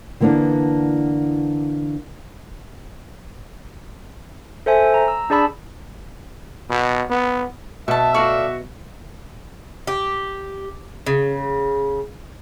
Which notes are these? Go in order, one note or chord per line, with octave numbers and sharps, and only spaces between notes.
D3 E3 A#3 B3 D4
A4 C5 E5 G#5
A#5
E6
D4 G#4 D5 A5 B5 E6
B2
B3
B2 E5 A5 C#6
F#4 A4 D5 F5 C#6
G4
C#3